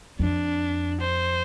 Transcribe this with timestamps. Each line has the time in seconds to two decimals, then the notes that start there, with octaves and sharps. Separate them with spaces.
0.19 F2 D4
1.00 C5